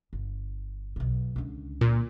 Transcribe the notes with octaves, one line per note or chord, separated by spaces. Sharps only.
G1
B1 B2
C#2 D3
A#2